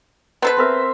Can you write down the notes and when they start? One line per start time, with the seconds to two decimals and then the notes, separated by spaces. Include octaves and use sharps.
0.42 B3 A4 B4 C5
0.57 C4 A#4 E5